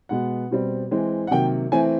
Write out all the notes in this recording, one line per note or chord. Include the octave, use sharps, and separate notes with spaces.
B2 G#3 B3 F#5
B2 G3 C4
E3 G#3 C4
F#5
C3 D#3 F#3 A#3 G5
E3 A3 C4 G#5